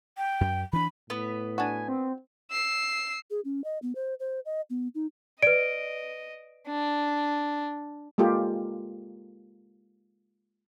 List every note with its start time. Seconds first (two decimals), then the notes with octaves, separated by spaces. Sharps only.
0.17 G5
0.41 F#2
0.73 E3 D4 B5
1.10 A2 B3 B4
1.58 D4 F#4 G#5
1.89 C4
2.51 E6 C7
3.31 G#4
3.45 C#4
3.64 D#5
3.82 B3
3.95 C5
4.20 C5
4.46 D#5
4.70 B3
4.95 D#4
5.42 B4 D5 D#5 D7
6.67 D4
8.18 G#3 A#3 F4 G4 A4 A#4